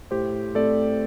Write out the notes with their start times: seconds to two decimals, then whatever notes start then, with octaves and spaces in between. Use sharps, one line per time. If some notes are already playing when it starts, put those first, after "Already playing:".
0.11 A2 G4 C5
0.55 A3 C4 A4 D5